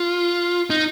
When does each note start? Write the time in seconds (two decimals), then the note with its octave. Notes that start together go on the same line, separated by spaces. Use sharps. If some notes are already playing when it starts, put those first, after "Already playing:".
Already playing: F4
0.70 D#4